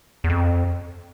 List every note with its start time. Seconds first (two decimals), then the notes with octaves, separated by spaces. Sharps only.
0.24 E2
0.30 F2